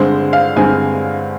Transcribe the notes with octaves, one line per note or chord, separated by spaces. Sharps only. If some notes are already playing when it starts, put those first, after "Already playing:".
Already playing: G2 D3 G#3 C4 C5
F5
G2 D3 G#3 C4 G#5